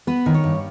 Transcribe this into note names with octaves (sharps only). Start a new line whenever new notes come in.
B3 B4
D#3
C#5
G2